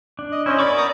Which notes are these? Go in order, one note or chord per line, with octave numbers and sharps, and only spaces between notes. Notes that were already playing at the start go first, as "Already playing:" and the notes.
D4
D#5
C#4 E4 C5 D#5
B3 A#4 D5 B5 C#6
A#5 D#6